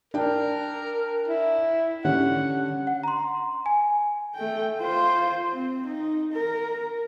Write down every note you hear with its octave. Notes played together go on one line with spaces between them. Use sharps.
D4 A#4 G5
E4
D3 G3 C#4 F#5
F#5
A#5 C6
G#5
A3 G5
F4 C5
C4
D#4
A#4